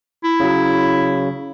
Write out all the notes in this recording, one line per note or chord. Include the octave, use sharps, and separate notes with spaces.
E4
C#3 F#3